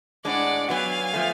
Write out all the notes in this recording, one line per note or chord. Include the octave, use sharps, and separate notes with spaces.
A2 G#3 D4 D5 F#5
F#3 B3 F#4 F5 G#5
F3 A3